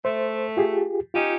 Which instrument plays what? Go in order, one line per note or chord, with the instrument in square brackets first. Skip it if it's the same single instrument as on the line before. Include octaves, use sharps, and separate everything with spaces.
[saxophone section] A3 [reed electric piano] C5
[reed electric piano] F4 G4 G#4
[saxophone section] C#4 D#4 G4 [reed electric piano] F4